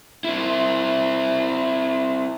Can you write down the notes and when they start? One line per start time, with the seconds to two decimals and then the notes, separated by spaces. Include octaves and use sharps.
0.24 C4 E4